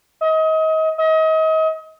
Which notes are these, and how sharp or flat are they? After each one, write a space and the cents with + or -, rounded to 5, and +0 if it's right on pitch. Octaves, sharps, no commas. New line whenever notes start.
D#5 +30
D#5 +35